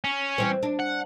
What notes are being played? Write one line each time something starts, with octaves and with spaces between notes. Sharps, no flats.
C#4
E3 G3 C4
D4
F#5